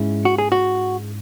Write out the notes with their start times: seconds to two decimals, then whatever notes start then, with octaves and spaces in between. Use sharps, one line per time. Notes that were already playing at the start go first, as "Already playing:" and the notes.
Already playing: G#2 G#3 C#4 E4
0.25 F#4
0.38 G#4
0.52 F#4